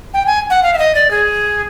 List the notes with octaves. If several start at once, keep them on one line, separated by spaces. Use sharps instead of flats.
G5
G#5
F#5
F5
E5
D#5
D5
G#4